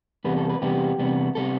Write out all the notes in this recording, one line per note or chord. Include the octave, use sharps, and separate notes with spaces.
E2 C3 G3 B3 B4
A4
B4
E2 C3 G3 B3 G4
E2 C3 G3 B3
C3 G3 B3 A4